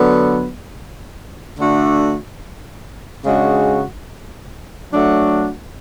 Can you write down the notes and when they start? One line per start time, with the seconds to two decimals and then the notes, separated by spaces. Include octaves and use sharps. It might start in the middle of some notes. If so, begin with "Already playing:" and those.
Already playing: D3 F#3 B3
1.58 D3 A3 D4 F#4
3.25 C#3 G#3 D4 F#4
4.91 F#3 A3 D4 F#4